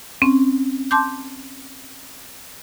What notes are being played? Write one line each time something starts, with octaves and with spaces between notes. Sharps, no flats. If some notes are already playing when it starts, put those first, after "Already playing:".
C4 C#4
A5 C6 D6 G6